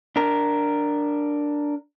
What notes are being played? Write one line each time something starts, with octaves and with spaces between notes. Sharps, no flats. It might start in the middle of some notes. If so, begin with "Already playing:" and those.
D4 A#4